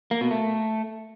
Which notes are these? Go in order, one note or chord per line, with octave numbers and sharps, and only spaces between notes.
A#3
B2
A3